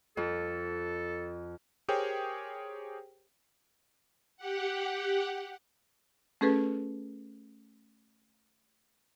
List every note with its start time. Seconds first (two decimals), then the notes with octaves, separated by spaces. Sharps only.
0.17 F2 A4
1.88 G4 G#4 A#4 C5 C#5 G5
4.37 G4 F#5
6.41 A3 C#4 G#4 A4 B4